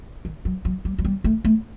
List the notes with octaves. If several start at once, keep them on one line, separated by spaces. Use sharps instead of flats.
D#3
F#3
F#3
G3
F#3
G3
A3
A3